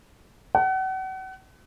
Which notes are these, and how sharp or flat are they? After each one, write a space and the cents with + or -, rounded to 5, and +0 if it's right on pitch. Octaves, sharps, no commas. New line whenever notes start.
F#5 +35